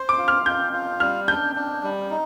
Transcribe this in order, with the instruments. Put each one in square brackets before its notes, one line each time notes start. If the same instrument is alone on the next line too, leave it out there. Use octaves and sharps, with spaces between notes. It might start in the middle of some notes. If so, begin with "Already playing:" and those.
Already playing: [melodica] C5 [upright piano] C6
[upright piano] D6
[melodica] F4
[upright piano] F6
[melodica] F4 [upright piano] G6
[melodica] F4
[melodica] G3 [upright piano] F6
[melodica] D4 [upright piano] G6
[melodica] D4
G3
D#4